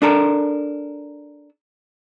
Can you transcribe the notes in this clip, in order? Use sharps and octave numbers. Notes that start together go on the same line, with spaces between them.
D4 A4 A#4